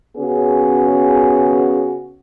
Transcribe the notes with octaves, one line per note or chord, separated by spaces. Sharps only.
C#3 B3 C#4 F#4 G#4